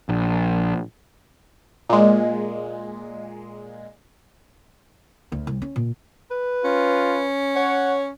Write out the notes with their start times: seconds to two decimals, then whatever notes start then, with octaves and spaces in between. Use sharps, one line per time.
0.09 A#1
1.89 A#2 G#3
5.32 D2
5.47 C2
5.62 C#4
5.76 A#2
6.31 B4
6.65 C#4 F4
7.56 C#5 F#5